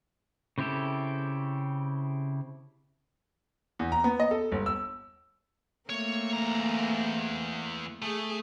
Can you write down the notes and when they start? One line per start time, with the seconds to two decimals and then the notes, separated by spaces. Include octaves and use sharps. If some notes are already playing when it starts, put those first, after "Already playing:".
0.58 C#3 C4 E4 G4 A4
3.79 E2
3.92 A#5
4.04 B3
4.20 D#5
4.31 A4
4.52 G1
4.66 E6
5.90 A3 A#3 C4 C#5
6.33 E2 A#5
8.02 A3 G#4